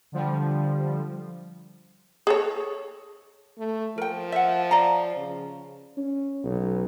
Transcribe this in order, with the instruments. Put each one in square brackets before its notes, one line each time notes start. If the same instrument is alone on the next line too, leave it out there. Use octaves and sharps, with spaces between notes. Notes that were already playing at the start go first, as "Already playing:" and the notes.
[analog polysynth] D3 F3 G3
[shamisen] G#4 A4 C#5
[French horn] A3
[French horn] F3 [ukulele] A#4 G5
[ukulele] E5 F#5
D5 F5 A#5
[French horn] C#3
[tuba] C#4
B1